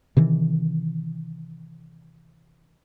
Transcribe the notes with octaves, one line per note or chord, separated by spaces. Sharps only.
C3 D#3 E3